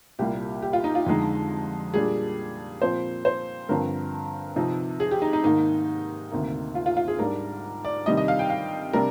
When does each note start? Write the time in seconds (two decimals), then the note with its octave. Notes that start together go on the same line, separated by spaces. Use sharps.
0.19 C2 A#2 G3 A#3 G4
0.62 G4
0.73 F4
0.84 D#4
0.95 F4
1.06 F2 D3 G#3 D#4
1.94 A#2 G3 D4 G#4
2.81 A#2 F3 C4 C5
3.25 C5
3.69 G2 D3 F3 C4 A#4
4.56 C3 F3 C4 D#4
5.00 G#4
5.11 G4
5.22 D#4
5.33 D#4
5.44 G#2 D#3 A#3 D#4
6.32 D2 C3 D#3 A#3
6.75 F4
6.86 F4
6.97 F4
7.08 G#4
7.19 G#2 G3 D4 A#4
7.85 D5
8.06 C3 D#3 G3 D4 D#5
8.17 D#5
8.28 F5
8.39 G5
8.50 F5
8.93 C3 G3 D4 A#4